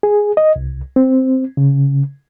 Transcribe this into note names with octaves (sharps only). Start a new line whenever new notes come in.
G#4
D#5
C2
C4
C#3